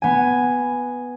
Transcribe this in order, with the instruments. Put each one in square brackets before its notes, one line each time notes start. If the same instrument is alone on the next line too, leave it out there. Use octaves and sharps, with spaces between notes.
[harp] B3 G#5